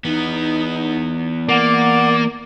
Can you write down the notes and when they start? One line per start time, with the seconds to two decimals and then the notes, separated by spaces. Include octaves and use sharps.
0.05 E3 B3 D#4
1.49 A#3 D5 F#5